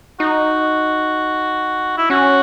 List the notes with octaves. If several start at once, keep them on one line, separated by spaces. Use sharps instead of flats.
D#4 F#4
E4
C#4 F#4